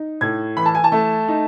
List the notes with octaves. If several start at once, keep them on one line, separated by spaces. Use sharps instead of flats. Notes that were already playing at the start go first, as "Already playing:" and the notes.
Already playing: D#4
A2 G#6
E3 B5
A5
G#5
A5
A3
D#4